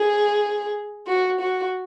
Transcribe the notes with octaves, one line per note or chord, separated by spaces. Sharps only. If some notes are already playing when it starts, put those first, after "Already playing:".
Already playing: G#4
F#4
F#4